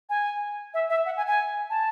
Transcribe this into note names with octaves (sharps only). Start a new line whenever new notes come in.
G#5
E5
E5
F#5
G#5
G#5
A5